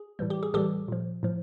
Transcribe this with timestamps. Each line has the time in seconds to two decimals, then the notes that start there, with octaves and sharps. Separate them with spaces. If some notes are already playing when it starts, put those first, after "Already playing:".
Already playing: G#4
0.19 A2 E3 G3
0.30 G4
0.43 G#4
0.54 A2 E3 G3 G4 A4
0.88 A#2 F3
1.23 A2 F3